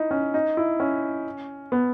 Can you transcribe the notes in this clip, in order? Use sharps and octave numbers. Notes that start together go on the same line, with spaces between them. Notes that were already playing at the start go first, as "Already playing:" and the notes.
Already playing: D#4 E4
C#4
D#4
E4
C#4
B3